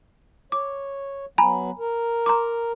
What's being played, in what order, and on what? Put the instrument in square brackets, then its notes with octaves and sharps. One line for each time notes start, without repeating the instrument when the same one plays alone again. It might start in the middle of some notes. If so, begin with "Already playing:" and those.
[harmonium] C#5 [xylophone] D6
[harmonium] F#3 B3 [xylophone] G#5 A#5 B5
[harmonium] A#4
[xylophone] A#5 C6 D6